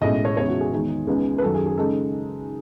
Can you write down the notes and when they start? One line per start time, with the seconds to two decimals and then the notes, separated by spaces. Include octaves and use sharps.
0.01 B1 A2 G#3 C#4 D#5
0.25 C#5
0.36 E2 C#3 G#3 D#4 C#5
0.48 F#4
0.61 G#4
0.72 E2 D#3 G#3 D#4
1.07 C#2 C#3 G#3 B3 D#4
1.38 B4
1.42 F#2 D#3 F#3 A4
1.54 G#4
1.66 G#4
1.77 C#3 G#3 D#4 A4